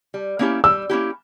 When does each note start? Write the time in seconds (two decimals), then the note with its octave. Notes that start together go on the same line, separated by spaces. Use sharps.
0.14 G3
0.39 A#3 C#4 E4 G4
0.64 G3 E6
0.90 A#3 C#4 E4 G4